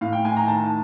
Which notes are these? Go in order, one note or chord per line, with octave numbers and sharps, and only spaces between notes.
A2 F5
G5
A2 G#5
A#5
D#3 A5